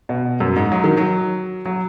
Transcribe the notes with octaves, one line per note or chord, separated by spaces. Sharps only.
B2
F#2
G#2
F#3
D#3
F#3
F#3